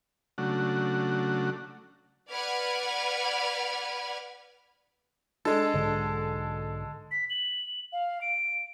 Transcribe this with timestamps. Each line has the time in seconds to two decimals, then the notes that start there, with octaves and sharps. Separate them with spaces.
0.38 C#3 F#3 A3 D4 F#4
2.31 B4 D5 F#5 B5 F6 G#6
5.45 G#3 D4 A4
5.74 B1 G#2 D3
7.11 B6
7.30 F#7
7.92 F5
8.21 D7